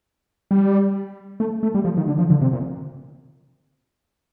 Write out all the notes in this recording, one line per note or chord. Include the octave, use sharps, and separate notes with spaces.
G3
A3
A3
G3
F3
D#3
D3
F3
D3
C3
A#2